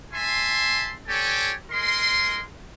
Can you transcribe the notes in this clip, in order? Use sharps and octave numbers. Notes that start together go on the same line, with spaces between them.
E5 G#5 A5 C6
G4 A4 C#5 D5 G#5
G#3 A#4 C6